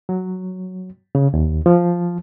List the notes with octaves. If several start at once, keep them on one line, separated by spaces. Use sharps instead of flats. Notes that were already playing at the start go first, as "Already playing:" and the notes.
F#3
C#3
D#2
F3